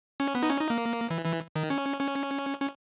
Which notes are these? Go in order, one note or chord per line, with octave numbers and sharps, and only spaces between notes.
C#4
B3
D#4
C#4
D#4
A#3
E3
E3
D#3
C#4
C#4
C#4